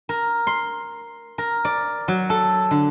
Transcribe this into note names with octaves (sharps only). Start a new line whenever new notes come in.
A#4
C6
A#4
D5
F#3
A4
D3